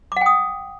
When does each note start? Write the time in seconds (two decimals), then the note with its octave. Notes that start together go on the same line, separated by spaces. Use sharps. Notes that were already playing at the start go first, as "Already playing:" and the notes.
0.12 D6
0.16 F#5
0.21 G5
0.26 D#6